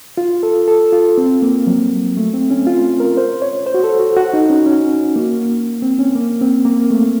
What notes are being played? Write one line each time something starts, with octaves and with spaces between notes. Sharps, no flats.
F4
A4
A4
F4
C4
A#3
F#3
A3
C4
C#4
F4
A#4
C5
C#5
C5
F#4
A4
F#4
F#4
D#4
C#4
C#4
A#3
C4
C#4
A#3
C4
A#3
A3